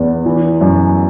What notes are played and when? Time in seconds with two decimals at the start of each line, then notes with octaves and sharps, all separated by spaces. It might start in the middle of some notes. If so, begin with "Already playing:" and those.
Already playing: E2 B3
0.26 E3
0.61 F#2